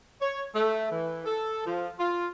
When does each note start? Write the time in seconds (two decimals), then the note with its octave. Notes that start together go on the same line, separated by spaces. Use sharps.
0.21 C#5
0.55 A3
0.91 E3
1.26 A4
1.66 F3
1.99 F4